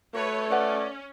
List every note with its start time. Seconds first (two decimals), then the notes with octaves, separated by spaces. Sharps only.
0.15 A3 F#4 B4 C#5 D5
0.50 C#4 F4 B4 D5 F#5